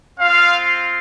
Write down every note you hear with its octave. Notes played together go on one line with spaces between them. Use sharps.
C4 F4 F5